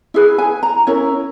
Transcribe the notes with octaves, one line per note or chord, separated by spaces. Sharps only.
E4 G#4 B4 E5
G#5
A#5
C#4 E4 A#4 C#5